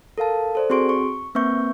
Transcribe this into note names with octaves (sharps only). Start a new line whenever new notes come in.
A4 A#4 F5 A5
A4 C5 D5
C4 F#4 G#4 C6 C#6 D7
C#6
A#3 C4 B4 E5 C#6 G6